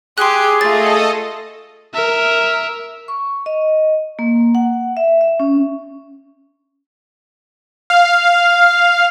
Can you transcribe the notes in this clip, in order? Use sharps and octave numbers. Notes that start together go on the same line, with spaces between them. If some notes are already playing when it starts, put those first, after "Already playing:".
G4 G#4 C6 F#6
A3 F4 A4 D#5 A6
A#4 E5
C#6
D#5
A#3
F#5
E5
E5
C#4
F5